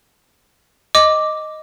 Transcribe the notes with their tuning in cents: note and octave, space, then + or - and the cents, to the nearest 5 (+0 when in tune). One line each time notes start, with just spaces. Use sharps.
D#5 +0 D6 +0